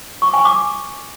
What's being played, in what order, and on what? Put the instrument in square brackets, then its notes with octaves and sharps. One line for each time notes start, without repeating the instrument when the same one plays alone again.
[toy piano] C#6
G#5
D6